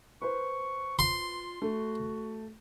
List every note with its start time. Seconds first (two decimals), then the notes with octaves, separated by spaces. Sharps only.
0.22 B4 C5 C#6
0.99 F4 C6
1.62 A3 F#4